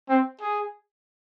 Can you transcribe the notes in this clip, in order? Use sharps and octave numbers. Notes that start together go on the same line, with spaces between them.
C4
G#4